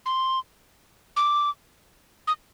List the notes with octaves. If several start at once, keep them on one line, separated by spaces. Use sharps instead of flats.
C6
D6
D#6